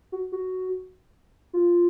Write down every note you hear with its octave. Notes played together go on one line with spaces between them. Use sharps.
F#4
F#4
F4